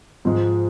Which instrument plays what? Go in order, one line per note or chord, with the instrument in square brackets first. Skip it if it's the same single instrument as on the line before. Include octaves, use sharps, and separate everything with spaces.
[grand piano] G#2 F3 G#3